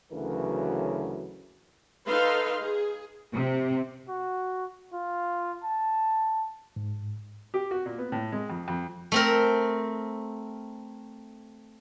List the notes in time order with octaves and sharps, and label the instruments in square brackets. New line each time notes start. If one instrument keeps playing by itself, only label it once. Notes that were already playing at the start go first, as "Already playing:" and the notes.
[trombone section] D2 C#3 E3 F#3 A#4 B4
[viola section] D#4 A4 B4 F5 C6
G#4
[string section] C3
[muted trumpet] F#4
F4
A5
[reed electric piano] G#2
[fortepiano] G4
F#4
A#2
B3
A2
G#3
F2
F2
[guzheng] A3 C4 A#4